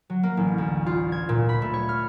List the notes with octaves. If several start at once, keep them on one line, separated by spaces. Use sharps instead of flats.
F#3
A#3
A1
D2
F4
G#6
A#2
B5
A3
C#5
F6